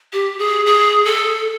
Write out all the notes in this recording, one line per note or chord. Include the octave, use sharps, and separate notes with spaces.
G4
G#4
G#4
A4